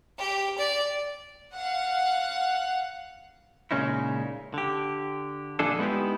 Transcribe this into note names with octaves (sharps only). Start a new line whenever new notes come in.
G4
D5
F5 F#5
A#2 C#3 G#3 C#4 D#4 E4
D3 G4
A#2 D3 F3 D4 G#4 A4
G#3 B3 D#4 E4 G4